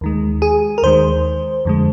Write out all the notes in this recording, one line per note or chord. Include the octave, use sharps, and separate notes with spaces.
D#2 D#3 G#3
G#4
A#4
D#2 D#3 G#3 C5
F2 D3 G#3